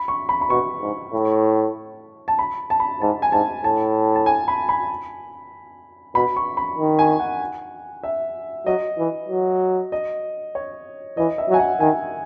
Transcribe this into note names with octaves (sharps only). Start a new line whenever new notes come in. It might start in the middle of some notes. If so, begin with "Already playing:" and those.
Already playing: B5
C#6
B5
B5
B2 C#6
G#2
A2
A5
B5
A5
B5
G#2 A5
G#5
G#2 A5
A2 A5
A5
G#5
B5
B5
B2 B5
C#6
B5
D#3
G#5
F#5
E5
F#3 D#5
E3
F#3
D#5
C#5
E3 D#5
E5
F#3
G#5
F#5
D#3 G#5